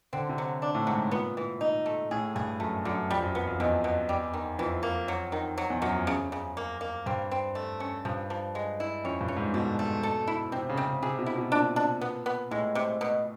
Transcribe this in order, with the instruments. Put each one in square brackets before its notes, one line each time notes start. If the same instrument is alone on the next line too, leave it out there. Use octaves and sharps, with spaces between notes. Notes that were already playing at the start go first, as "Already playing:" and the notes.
[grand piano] D3 [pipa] C4
[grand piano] C3
[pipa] F#3
D4
[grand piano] A2
[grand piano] G#2 [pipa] F#3
[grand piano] A#2 [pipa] B3
[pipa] E3
D#4
A3
[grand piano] A2 [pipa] G#4
[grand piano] G2 [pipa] G#4
[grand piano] F#2 [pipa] A3
[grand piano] F#2 [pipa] D3
[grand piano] F2 [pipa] G3
[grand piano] F#2
[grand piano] F#2 [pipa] B3
[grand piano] F2
[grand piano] E2 [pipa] B2
[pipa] B2
G3
D#3
[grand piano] F2 [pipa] E3
[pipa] A#3
F#3
D#3
F#3
[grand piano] E2
[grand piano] F#2 [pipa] F#3
[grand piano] F2
[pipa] C#3
C#3
A#3
A#3
[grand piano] G2 [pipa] C4
[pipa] C4
A3
C#4
[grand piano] G2 [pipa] F3
[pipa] F3
G#3
E4
[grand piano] F2 [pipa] C#4
[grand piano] G2
[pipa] C#4
[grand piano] G#2
[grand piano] B2 [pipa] A3
[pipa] A3
A4
E4
[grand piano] C3 [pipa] C4
[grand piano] C#3
[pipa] C4
[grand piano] C#3
[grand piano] C3 [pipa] G#4
[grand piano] B2
[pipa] E4
[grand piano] B2
[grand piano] A#2 [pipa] D4
[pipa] D4
B3
B3
[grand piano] A2 [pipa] G#3
[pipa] C3
B2